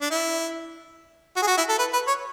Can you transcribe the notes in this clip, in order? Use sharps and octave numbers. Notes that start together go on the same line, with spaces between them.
D4
E4
F#4
G#4
F#4
E4
A4
B4
B4
C#5